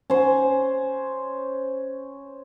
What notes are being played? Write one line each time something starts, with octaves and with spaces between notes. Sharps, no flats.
C#4 C5